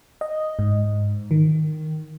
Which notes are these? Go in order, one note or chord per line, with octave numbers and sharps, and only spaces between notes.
D#5
G#2
D#3